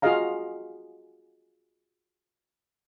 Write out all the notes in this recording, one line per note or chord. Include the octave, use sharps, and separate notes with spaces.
F4 F#4 G#4 D#5 F5 A#5